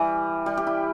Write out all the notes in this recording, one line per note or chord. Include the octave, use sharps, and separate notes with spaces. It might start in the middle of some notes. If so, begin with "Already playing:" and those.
Already playing: E3 G3
G3
G4
E4